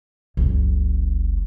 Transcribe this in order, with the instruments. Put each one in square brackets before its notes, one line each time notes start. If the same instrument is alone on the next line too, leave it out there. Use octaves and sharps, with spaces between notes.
[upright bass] F#1 C#2